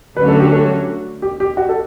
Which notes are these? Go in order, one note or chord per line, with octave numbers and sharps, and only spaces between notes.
D3 F#3 A3 C#4 F#4 B4
A4
G4
A4
G4
G4
F#4
A4